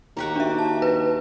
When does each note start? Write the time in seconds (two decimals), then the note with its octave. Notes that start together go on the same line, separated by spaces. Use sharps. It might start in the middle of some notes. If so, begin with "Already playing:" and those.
0.17 D#2 F#4 G4 A#4
0.36 D4 E5
0.59 A5
0.82 B4